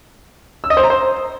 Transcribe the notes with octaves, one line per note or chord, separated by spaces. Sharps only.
E6
D#5
C5
A#5
C5